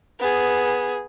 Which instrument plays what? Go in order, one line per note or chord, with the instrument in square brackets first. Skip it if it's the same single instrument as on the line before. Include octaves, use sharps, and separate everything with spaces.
[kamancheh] B3 G#4